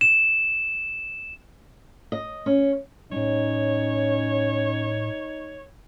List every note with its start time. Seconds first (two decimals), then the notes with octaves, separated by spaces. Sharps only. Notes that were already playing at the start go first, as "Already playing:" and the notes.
0.01 E7
2.12 D#5
2.46 C#4
3.12 A2 G3 C#4 D#4 C#5